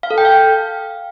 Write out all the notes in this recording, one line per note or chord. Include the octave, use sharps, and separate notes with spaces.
F5
A4
G5
F5